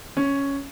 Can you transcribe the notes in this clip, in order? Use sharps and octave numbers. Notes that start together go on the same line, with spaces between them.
C#4